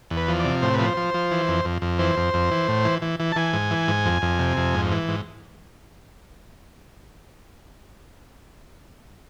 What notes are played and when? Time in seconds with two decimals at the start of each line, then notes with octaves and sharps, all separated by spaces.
0.11 E2
0.17 B4
0.28 F3
0.39 C3 D5
0.62 A2 C5
0.74 F3 B4
0.86 C5
0.97 F3
1.14 F3
1.31 E3
1.48 F2
1.65 F2
1.82 F2
1.99 E3 C5
2.17 F2
2.34 F2
2.51 E3
2.68 A2
2.85 E3
3.02 E3
3.20 E3
3.32 A5
3.36 E3 G#5
3.53 G#2
3.71 E3
3.88 G#2
4.05 F2
4.22 F2
4.39 C3
4.57 F2
4.74 G#2
4.92 E3
5.08 G#2